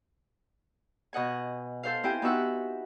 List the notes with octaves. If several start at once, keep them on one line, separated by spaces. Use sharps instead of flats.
B2 D#5 F#5 G#5
A4 C5 F5
C4 E4 G4 G5 G#5
B3 D#4 F#4 E5 F#5 E6